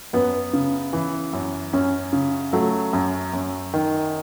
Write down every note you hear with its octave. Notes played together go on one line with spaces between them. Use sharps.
F#2 B3
C#3
E3
F#2
F#2 C#4
C#3
F#3 A3
F#2
F#2
D#3